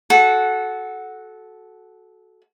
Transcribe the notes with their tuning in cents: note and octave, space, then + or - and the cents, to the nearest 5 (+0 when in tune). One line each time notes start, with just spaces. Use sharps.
F#4 +0 A4 -20 F#5 +0